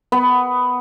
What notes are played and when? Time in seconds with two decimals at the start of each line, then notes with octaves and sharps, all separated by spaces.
0.12 B3